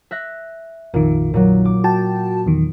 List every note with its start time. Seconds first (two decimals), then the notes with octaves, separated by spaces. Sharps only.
0.11 E5 F#6 A#6
0.94 A#1 F2 A#2 D#3
1.34 A#2 F#3
1.65 D6
1.84 F#4 G5 A5
2.47 E2 D#3